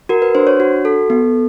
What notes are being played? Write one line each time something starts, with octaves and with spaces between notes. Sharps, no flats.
F#4 A#4
B4
D4 C5
C#5
F#4
A4
B3